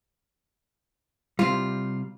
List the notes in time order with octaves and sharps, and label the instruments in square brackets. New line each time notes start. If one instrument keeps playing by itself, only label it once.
[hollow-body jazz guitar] C3 G3 [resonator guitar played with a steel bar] F4